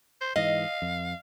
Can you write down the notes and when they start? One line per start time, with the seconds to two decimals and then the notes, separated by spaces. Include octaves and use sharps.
0.21 C5
0.36 G#2 E3 D#5 F5
0.82 F2